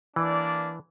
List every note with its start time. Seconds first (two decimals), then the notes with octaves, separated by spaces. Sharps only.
0.16 E3 A#3 D4 D5